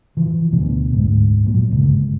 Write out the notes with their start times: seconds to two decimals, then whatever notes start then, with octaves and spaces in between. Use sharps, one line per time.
0.17 E3 F3
0.52 D2 B2
0.92 D2 G#2
1.46 A#2 F#3
1.72 G1 C#2